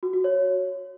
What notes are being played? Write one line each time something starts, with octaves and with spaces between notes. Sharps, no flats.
F#4
F#4
C#5